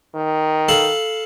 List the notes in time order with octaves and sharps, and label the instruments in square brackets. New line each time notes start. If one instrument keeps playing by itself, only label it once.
[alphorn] D#3
[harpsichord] A4 F5 B5